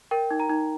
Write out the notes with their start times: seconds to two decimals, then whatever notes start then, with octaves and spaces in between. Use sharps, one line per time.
0.11 A#4 G5
0.31 D#4
0.40 A#5
0.50 D#4